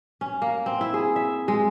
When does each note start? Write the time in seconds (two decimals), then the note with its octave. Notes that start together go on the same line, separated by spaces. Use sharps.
0.21 C#4
0.42 A#3
0.66 C4
0.81 E4
0.94 G#4
1.16 E5
1.48 G#3